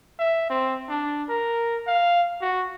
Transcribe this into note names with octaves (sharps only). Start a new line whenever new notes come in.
E5
C4
D4
A#4
F5
F#4